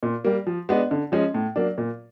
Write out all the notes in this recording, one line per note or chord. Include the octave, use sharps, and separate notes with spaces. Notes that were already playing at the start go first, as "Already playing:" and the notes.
A#2
G3 A#3
F3
G#3 B3 D4
D3
F3 G#3 C#4
A2
F#3 A#3 D4
A#2